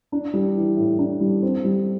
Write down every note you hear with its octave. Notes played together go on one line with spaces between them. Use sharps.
D4
G3
E3
A2
D4
G3
C4
G3